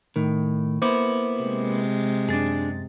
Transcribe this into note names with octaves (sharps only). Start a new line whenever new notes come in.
A2 D#3
A#3 B3 E4 C5 D6
C3 G#3
F#2 D4 G#4 A6